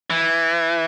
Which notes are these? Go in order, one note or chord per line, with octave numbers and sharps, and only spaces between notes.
E3